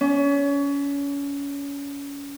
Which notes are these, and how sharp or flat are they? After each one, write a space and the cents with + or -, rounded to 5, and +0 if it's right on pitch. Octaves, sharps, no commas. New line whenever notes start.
C#4 +30